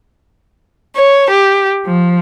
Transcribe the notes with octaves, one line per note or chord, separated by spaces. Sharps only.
C#5
G4
F3